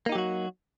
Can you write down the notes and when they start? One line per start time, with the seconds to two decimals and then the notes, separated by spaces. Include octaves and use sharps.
0.06 A#3
0.09 D#4
0.12 G4
0.15 F#3
0.18 F#4